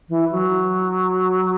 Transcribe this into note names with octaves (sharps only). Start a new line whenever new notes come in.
E3
F#3